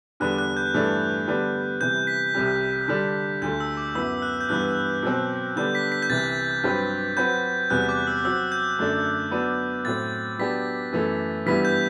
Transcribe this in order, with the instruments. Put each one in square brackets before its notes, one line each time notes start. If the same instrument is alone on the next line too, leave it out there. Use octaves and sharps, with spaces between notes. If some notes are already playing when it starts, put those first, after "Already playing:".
[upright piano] E2 D3 G3 B3 D4 [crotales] F#6
[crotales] F#6
G6
[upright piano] G2 E3 A3 D4
D3 G3 B3 D4
[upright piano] C3 E3 G3 [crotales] G6
[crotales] B6
[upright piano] C2 C3 G3
D3 G3 D4
[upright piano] D2 D3 A3 [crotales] G6
[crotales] E6
D6
[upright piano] F#2 F#3 B3 E4 [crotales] E6
[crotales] F#6
G6
[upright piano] G2 E3 B3 [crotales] F#6
[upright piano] B2 F#3 C4
[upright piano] D3 G3 B3 D4 [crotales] G6
[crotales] B6
B6
G6
[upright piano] C2 C3 E3 [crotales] A6
[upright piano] G2 F#3 C4 G4 B4
[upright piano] F#3 C4 F#4 B4 [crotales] G6
[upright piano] E2 C3 G3 B3 F#4 [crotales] F#6
[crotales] D6
E6
[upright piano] F#3 C4 F#4 [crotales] E6
[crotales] G6
[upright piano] F#2 D3 A3 D4
F#3 B3 D4
[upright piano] A2 F#3 C4 [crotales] A6
[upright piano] F#3 B3 D4 G4 [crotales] B6
[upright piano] F#2 E3 A3
[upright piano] G2 E3 G3 B3 E4 [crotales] B6
[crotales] G6